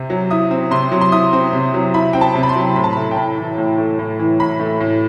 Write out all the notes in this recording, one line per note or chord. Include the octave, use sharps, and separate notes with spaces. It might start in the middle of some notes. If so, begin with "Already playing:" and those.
Already playing: C3 C4
F#3
E4 D#6
C4
C3 C6
F#3
C6
E4 D#6
C4
C3
F#3
E4 B5
C4 G5
A5
C3
B5
C6
F#3
A2 B5
A5
A3 B5
G5
A2 A5
E3
A2
A3
A2
E3
A2 B5
A3
A2